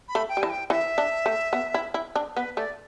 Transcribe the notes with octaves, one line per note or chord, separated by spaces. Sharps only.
B5
A3
G5
G3
E3 A5
G5
E3 E5
D4
A3
B3
E4
E4
D4
B3 B4
A3 D5